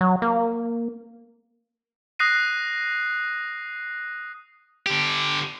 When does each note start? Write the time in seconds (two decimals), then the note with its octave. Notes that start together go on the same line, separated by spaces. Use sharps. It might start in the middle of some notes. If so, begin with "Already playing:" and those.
0.01 F#3
0.22 A#3
2.19 D#6 F#6 A#6 C7 D#7
4.86 D3 G4